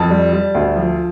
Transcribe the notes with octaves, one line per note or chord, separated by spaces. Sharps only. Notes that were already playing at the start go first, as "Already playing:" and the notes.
Already playing: F2 A5
G3
G3
D2
F3